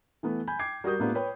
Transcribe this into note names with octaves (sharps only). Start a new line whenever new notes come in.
E3 A3 B3
G#5 B5 G6
G5 D6 G#6 C7
G3 F#4 A#4 D#6 G6
A2 A#3 B3 D4 F4 G4
B4 C#5 G5 B5